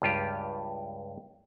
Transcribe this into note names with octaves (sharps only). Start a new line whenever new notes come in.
C#2 G2 F4 G4